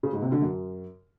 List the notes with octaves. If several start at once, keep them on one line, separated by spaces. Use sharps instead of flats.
C#3
G#2
C3
D3
F#2